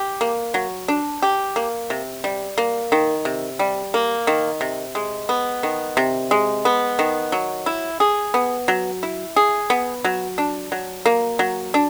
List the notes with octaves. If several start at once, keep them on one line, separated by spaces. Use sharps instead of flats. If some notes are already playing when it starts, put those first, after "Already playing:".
Already playing: G4
A#3
F#3
D4
G4
A#3
C3
G3
A#3
D#3
C3
G3
A#3
D#3
C3
G#3
B3
D#3
C3
G#3
B3
D#3
F#3
E4
G#4
B3
F#3
E4
G#4
B3
F#3
D4
F#3
A#3
F#3
D4